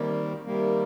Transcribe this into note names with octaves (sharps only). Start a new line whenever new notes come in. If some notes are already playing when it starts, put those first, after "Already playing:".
Already playing: C3 D#3 G3 A#3
C3 D#3 G3 A#3